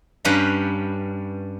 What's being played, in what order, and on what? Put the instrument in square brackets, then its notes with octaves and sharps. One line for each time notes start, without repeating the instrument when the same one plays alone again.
[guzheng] G2 G3 C#4 B4 F5 A#5